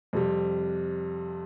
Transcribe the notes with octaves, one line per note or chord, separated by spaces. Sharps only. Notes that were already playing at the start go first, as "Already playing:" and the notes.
F2 C3 G3